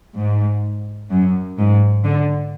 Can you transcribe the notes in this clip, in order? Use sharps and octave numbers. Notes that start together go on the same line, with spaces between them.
G#2
F#2
G#2
D3